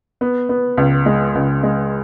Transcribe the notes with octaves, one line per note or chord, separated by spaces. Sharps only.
B3
B3
C#2
G#3
C#2
G#3